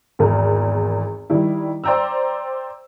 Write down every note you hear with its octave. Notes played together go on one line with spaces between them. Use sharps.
G#1 E2 A#4
D#3 G3 E4
C5 D5 G5 A#5 E6